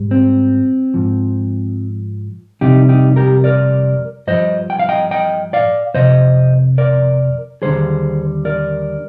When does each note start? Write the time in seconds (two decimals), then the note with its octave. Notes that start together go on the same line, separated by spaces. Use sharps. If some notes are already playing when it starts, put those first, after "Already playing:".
Already playing: G#2 G3
0.11 C4
0.94 G#2 F3
2.61 F2 C3 G3 D#4 G4
2.89 D#4 G4
3.16 G4 A#4
3.44 A#4 D5
4.27 G2 F3 C5 D#5
4.70 G5
4.79 F5
4.89 D#5 G5
5.11 D#5 G5
5.53 D5 F5
5.94 F2 C3 F3 C5 D#5
6.78 A#4 D5
7.62 D#2 D3 G3 G#4 C5
8.45 A#4 D5